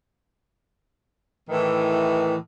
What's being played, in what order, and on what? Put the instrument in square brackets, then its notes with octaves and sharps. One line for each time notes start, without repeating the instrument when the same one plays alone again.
[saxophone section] A2 D#3 E3